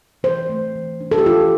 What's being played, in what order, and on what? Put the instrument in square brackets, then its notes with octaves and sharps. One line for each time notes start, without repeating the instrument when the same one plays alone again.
[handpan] E3 C5
A3
E3
D4
A4
G4
E3 F4